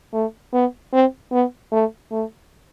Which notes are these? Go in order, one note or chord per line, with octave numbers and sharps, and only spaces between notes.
A3
B3
C4
B3
A3
A3